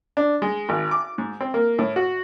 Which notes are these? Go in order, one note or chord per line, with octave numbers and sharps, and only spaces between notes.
D4
G#3
G#1
D6
G#2
C4
A#3
A2
F#4